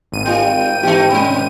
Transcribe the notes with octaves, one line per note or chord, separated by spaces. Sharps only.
G#1 D#7
D#3 G3 F4 G5
E3 A3 D#4 G4
B2 G#3 C#4